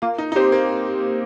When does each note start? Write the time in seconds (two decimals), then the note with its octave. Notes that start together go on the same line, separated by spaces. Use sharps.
0.02 A#3 F4
0.18 D#4
0.32 D#4
0.36 C4 G4 C5
0.52 A#3